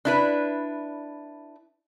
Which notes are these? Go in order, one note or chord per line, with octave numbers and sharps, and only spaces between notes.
D4 E4 B4